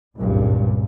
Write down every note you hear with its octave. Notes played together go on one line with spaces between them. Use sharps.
G#1 C#2 G2 A#2